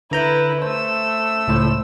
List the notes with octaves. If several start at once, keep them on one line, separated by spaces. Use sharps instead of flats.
D3 E4 B4 A#5 G6
A3 C5 E6
C#2 A2 C5